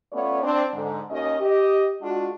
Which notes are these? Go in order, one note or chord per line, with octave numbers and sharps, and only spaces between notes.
A3 B3 C#4 F4 C#5 D5
C4 D4
G#2 D3
D#2 D#3 C#4 D#5
G4 D#5
G#3 D4 F4 F#4